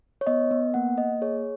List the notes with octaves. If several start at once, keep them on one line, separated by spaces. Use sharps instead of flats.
C#5
B3 D#5
B3
A#3 F#5
A#3 D#5
G#4 C#5